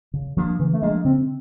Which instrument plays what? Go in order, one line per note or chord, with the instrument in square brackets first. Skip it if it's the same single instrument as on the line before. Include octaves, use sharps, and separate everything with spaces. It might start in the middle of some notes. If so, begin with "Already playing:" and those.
[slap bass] C#3
F3 A#3 D4
[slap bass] C#3 [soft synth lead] E3
[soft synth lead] A3
[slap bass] F3 A#3 D4 [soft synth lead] G#3
[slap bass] C#3 [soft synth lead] C4